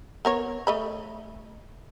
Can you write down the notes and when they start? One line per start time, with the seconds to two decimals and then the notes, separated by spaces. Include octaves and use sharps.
0.25 B3 A#4 C#5
0.67 A3 D#5 B5